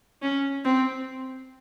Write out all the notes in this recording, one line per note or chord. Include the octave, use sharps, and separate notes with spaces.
C#4
C4